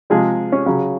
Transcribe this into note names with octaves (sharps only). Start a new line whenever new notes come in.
C3 F3 G#3 G#4
C#4
C#3 F#3